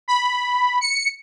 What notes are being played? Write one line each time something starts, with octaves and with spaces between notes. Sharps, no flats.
B5
C#7